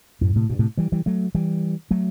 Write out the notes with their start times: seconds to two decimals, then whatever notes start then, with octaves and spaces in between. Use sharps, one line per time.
0.21 F#2 A2
0.36 A2 C3
0.49 G2 B2
0.59 A2 C3
0.77 E3 G3
0.92 E3 G3
1.06 F#3 A3
1.35 E3 G3
1.91 F#3 A3